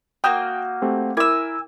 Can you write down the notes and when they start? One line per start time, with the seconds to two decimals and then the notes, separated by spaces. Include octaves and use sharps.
0.24 A#3 F#4 G5 D#6 F6 G6
0.82 A3 C4 G4
1.17 E4 A#4 G#5 D6 E6